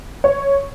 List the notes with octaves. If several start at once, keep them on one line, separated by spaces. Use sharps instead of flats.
C#5